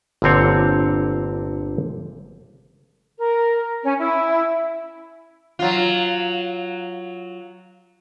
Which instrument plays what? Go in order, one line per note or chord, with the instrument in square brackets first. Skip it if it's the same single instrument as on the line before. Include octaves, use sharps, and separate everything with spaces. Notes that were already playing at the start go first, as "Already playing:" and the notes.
[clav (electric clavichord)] G1 A#2 D3 C4 C#5
[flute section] A#4
C#4
E4
[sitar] F#3 F4